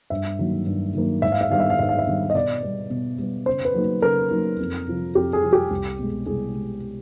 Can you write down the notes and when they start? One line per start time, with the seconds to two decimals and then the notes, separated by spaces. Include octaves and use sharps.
0.10 G2 E5
0.39 D#3 F#3 A#3
0.67 G2
0.95 D#3 F#3 A#3
1.22 G#2 E5
1.32 F5
1.41 E5
1.50 D#3 G3 B3 D4 F5
1.60 E5
1.70 F5
1.79 G#2 E5
1.89 F5
1.99 E5
2.06 D#3 G3 B3 D4
2.30 D#5
2.34 B2 D5
2.62 G3 B3
2.90 B2
3.18 G3 B3
3.46 C#3 C5
3.65 B4
3.74 F#3 A#3 D#4
4.02 C#3 A#4
4.31 F#3 A#3 D#4
4.59 F2
4.87 C3 F3
5.15 F2 G4
5.33 G#4
5.42 C3 F3
5.53 G4
5.71 C2
5.99 B2 G#3
6.26 C2 G#4
6.54 B2 G#3